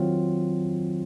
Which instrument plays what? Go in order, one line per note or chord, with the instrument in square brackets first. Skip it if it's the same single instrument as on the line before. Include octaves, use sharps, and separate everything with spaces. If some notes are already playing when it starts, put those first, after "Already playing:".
Already playing: [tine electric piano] D#3 F#3 C4 F4